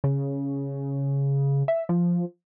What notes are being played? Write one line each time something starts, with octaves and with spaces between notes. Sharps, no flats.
C#3
E5
F3